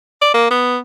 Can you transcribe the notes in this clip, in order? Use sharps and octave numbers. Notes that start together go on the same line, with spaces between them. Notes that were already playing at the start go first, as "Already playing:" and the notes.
D5
A#3
B3